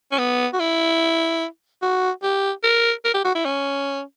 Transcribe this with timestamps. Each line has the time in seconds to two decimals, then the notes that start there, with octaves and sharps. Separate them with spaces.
0.12 C#4
0.18 B3
0.54 F#4
0.60 E4
1.82 F#4
2.23 G4
2.64 A#4
3.05 A#4
3.14 G4
3.25 F#4
3.35 E4
3.45 C#4